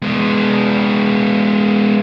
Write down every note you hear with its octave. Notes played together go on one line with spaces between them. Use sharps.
G#3 B3